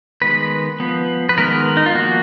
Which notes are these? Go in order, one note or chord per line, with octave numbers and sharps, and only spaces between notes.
D#3 G#3 B3 B4
F3 B3
B4
D#3 G#3 B3 A#4
D#4
F4
F3 A#3 F#4